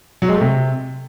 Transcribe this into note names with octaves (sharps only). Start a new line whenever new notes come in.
F#3
G#3
A3
C3